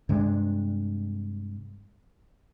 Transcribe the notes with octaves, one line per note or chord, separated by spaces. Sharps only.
G2 C3 G#3 D4